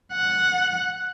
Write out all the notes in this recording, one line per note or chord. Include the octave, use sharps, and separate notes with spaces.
F#5